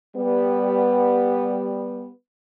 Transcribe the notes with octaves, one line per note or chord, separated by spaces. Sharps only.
G3 B3